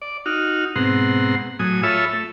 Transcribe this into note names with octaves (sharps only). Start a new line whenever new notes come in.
D5
D#4 F#4 F6
G#2 B2 C4 F#5 A#5 C6
A2 F#3 G#5 D#6
F4 A4 C#5 E5 B5 E6
A3